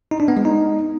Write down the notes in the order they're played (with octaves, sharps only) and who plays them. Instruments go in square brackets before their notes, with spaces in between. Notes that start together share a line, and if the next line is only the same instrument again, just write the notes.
[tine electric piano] D#4
D4
B3
G#3
D#4